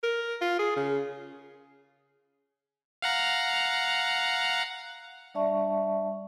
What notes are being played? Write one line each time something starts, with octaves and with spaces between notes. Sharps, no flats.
A#4
F4
G#4
C#3
F5 F#5 A#5
G3 D4 D5 E5 A5 C#6